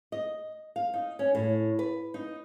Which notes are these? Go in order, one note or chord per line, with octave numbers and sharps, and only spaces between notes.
D#5
F5
D#4
C#4
A2
B4
D#4